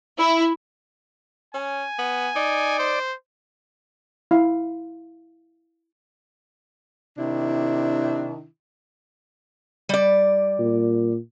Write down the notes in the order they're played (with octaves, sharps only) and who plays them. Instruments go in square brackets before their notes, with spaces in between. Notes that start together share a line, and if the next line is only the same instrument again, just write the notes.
[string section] E4
[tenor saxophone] C#4 [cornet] G#5
[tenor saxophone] B3
[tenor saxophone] D#4 [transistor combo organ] D5
[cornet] C5
[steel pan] E4 F5
[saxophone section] C3 D#3 D4 E4
[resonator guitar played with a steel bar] G3 D5
[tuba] A#2